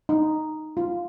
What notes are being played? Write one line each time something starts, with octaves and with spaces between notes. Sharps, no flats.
D#4
F4